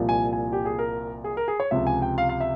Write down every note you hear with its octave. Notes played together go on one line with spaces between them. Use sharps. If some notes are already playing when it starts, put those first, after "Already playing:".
Already playing: C2 A#2 F3
G#5
G#5
G4
G#4
A#4
G#4
A#4
G#4
C#5
C#2 C3 F3 E5
G#5
G5
F5
F5
E5